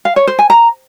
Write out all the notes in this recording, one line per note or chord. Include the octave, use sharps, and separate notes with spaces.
F5
C#5
C5
G#5
A#5